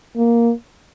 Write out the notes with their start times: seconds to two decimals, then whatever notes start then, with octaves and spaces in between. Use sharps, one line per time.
0.17 A#3